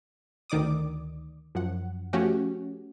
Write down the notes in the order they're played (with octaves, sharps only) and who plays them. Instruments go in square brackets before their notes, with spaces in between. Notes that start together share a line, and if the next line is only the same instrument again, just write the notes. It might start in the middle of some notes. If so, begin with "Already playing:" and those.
[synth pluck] D2 D#3 D5 D6 D#6
F#2 F3 F#5
F3 A3 C#4 F#4 G4